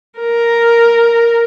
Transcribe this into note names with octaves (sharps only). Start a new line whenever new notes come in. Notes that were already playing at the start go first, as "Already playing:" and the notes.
A#4